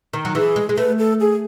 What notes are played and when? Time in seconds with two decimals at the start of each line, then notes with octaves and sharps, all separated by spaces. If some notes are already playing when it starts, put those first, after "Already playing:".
0.13 D#3
0.25 F#3
0.35 E3 G#4
0.56 G#3
0.69 G#3
0.77 A3 B4
0.98 A4
1.20 G#4